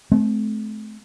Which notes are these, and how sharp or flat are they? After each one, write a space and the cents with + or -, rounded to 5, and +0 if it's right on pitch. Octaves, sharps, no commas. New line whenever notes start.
A3 -40 C4 -20